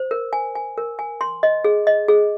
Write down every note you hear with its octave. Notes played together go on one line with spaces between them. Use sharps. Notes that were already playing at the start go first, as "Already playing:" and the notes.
Already playing: C5
A#4
G#5
G#5
A#4
G#5
C6
D#5
G#4
D#5
G#4